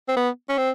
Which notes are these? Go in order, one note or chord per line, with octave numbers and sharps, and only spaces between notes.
C4
B3
C#4
C4